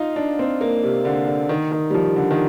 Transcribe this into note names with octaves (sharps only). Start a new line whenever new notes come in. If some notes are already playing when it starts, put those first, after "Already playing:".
Already playing: D#4 F4
D4
C4
A#3
C3
D3
D3
D#3
D#3
G3
F3
D3
D#3